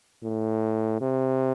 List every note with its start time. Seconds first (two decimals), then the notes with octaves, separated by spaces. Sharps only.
0.23 A2
1.01 C3